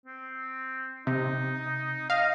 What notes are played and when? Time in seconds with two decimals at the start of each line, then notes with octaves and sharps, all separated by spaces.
0.06 C4
1.07 C3 D#4
2.10 D#5 F5